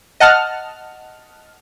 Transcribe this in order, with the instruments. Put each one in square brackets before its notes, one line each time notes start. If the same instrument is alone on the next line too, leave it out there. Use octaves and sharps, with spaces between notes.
[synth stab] D#5 F#5 A5 F6